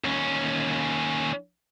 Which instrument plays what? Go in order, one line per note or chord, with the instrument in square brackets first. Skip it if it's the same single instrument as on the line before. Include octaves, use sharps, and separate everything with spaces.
[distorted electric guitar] D#2 C#4